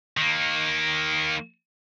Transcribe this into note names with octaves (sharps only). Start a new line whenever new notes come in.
D#3 A#3